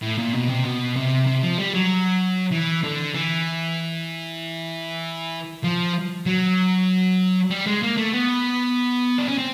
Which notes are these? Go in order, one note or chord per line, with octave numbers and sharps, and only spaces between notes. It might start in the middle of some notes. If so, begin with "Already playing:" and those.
A2
A#2
B2
C3
B2
C3
C3
F3
G3
F#3
E3
D3
E3
F3
F#3
G3
G#3
A#3
A3
B3
D4
C#4
C4